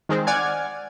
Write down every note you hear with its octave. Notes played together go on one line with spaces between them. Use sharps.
D#3 G#3 C4
D5 F#5 G#5 F6 G#6